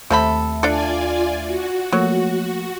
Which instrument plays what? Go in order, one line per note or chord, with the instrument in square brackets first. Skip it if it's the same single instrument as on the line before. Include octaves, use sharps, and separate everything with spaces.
[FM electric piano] D#2 A3 E5 [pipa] C3 A4 B5
[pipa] D4 A4 [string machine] F4 D5 G#5
[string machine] F#4
[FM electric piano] F3 A3 A#3 [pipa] F#3